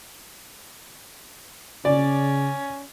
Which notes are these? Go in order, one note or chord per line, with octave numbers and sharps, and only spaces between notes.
C#3 C#4 D5